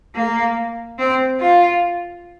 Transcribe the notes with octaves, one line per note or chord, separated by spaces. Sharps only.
A#3
C4
F4